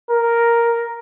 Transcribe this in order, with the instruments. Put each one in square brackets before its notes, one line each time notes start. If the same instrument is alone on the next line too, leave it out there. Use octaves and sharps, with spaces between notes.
[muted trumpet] A#4